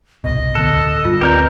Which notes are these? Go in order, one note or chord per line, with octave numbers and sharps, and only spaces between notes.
G1 C2 B2 D#5
D1 D3 B3 A4 F#6
G2 F4
D2 C4 G4 A#4 B4 D5 A#5 G6